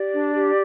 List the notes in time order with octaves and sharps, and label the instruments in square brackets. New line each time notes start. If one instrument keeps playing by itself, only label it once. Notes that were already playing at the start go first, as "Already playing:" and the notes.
Already playing: [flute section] G4 D5
D4
G4